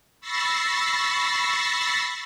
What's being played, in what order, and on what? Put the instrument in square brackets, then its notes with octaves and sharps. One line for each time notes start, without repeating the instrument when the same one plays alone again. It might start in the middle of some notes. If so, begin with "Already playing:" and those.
[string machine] B5 C#6 E6 A6 A#6 C7